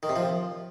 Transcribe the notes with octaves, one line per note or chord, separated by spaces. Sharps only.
D#3
C3
F3